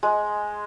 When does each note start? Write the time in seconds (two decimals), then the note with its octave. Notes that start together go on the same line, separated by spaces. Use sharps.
0.03 G#3